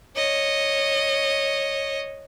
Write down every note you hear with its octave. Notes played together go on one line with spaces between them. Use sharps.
C#5 D#5